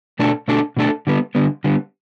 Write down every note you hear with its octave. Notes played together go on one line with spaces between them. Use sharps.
B2 A3 D4 A4
B2 A3 D4 A4
B2 A3 D4 A4
D3 G3 B3
D3 G3 B3
D3 G3 B3